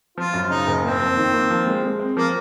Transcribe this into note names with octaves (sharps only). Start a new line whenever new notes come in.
F3 F4
F#2
C#3 D#4
F#1
A#3 C4
F2
D#3
A#3
F3
G#3
G#3
C4
F3 A#3